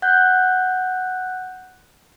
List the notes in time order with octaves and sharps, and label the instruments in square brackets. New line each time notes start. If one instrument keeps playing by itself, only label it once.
[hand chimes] F#5 F#6 G6